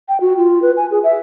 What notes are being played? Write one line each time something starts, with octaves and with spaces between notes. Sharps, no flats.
G5
F#4
F4
B4
G#5
G#4
E5